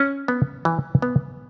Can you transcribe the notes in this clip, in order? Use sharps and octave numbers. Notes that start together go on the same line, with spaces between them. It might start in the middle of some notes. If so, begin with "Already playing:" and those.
Already playing: C#4
B3
E3
B3